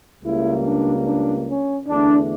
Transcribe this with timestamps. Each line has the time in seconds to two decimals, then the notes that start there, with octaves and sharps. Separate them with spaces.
0.23 C#2 C#3 G3 A#3 E4
0.65 D4
1.06 D4
1.48 C#4
1.88 E2 D3 A3 D4